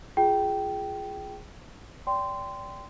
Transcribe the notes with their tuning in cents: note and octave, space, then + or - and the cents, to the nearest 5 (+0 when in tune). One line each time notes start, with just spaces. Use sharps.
F4 +0 G#4 +0 G5 -15
D5 -30 G5 +0 C6 -15